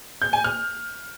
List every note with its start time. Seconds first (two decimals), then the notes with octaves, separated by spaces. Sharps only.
0.22 G6
0.33 G#5
0.44 F6